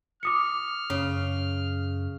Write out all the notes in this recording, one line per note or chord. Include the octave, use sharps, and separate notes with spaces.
D6 D#6 F6 C#7
F#2 C#3